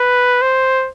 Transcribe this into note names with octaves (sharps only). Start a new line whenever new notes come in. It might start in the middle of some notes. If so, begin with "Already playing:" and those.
Already playing: B4
C5